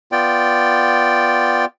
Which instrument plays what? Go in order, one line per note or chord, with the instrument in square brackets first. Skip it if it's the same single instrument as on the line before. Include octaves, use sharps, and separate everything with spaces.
[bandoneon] B3 F4 D5 G5